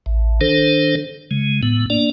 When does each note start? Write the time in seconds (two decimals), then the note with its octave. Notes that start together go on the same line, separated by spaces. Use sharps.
0.06 A1
0.41 D#3 D4 A4 C5
1.31 C#3 G#3
1.63 A2 B3
1.90 A#3 D4 D5